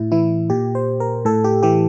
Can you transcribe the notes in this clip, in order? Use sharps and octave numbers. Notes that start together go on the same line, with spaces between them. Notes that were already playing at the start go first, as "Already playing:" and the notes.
Already playing: A2 E4
E3 E4
A#2 G4
C5
A#4
A2 A4
G4
E3 G4